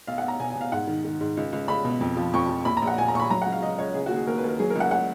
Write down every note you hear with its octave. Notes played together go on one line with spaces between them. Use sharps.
B1 F5
F#5
B1 A#5
B2 G#5
G#5
B2
F5
G#2 F#5
D#3
D#3
G#2
C#2
C#2
C#2 B5
B2
F2
F3
F2 C#6
F3
A#1 B5
A#5
A#1
F#5
A#2 G#5
A#5
A#2 C#6
B5
F#3 A#5
C#2 F#5
F5
C#2 D#5
C#2 C#5
C#3 G#4
D#2 F#4
G#4
D#2 A#4
B4
D#2 A#4
F#3 G#4
A#4
C#2
F#5
F#5